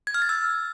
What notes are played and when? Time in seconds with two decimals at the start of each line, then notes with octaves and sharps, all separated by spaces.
0.07 G#6
0.14 F6
0.22 A6
0.29 E6